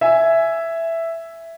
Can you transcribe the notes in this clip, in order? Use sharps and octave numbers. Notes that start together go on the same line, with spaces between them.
E5 G#5